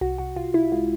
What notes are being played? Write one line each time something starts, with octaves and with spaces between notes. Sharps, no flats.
C2 F#4
C2 F#4
C2 F4
C2 E4
G#3 F4